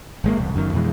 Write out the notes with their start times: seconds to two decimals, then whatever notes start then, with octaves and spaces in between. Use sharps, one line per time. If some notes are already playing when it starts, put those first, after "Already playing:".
0.24 G#1 G#3 A#3
0.38 E1 C2
0.55 F#1 F#2 A2 D#3
0.73 F2 B2 E3 G#3